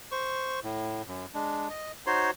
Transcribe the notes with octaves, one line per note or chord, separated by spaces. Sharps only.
C5 C#6
A2
F#2
G#3 D4
D#5
D#4 F#4 C5 C#5 C6